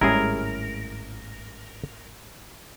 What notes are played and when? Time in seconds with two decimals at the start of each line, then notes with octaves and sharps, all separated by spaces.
0.01 G#1 A2 G3 G#3 C#4 E4 G#4 A#4